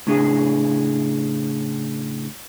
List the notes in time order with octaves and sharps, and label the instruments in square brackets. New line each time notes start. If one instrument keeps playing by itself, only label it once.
[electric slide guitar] A2 C#3 D4 G#4